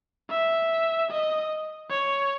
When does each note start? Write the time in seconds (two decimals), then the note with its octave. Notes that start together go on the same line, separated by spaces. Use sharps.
0.30 E5
1.11 D#5
1.91 C#5